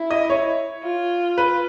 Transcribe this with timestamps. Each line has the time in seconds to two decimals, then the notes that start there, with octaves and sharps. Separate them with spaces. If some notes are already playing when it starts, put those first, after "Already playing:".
Already playing: E4
0.11 D#5
0.30 C#5
0.83 F4
1.38 B4